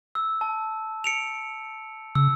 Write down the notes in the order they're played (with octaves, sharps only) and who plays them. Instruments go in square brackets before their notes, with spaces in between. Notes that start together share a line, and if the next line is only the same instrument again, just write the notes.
[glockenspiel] E6
A5
C#7 D7 F7
[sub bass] C#3 [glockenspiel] E6